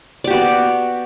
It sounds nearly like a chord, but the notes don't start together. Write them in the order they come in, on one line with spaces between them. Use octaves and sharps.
D5 G4 F#4 B3